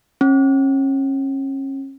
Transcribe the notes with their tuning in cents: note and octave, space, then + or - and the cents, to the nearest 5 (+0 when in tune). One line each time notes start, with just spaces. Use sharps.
C#4 -35